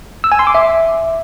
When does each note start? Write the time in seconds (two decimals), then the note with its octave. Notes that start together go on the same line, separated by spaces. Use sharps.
0.24 E6
0.32 G#5
0.39 C6
0.47 D6
0.55 E5